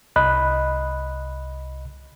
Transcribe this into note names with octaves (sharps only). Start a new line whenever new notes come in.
C2 D#5 B5 F#6